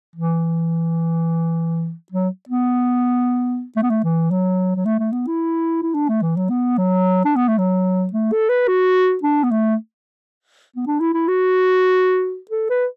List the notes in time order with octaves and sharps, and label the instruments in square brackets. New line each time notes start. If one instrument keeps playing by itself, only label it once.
[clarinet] E3
F#3
B3
A3
B3
A3
E3
F#3
F#3
A3
A3
B3
E4
E4
D4
A3
E3
F#3
B3
F#3
D4
B3
A3
F#3
A3
A4
B4
F#4
D4
B3
A3
B3
D4
E4
E4
F#4
A4
B4